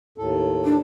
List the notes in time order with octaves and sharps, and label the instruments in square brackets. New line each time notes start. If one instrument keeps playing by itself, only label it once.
[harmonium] D#2 A2 A4
[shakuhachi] D4